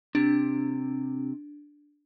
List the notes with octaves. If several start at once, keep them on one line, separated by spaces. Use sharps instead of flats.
C3 D4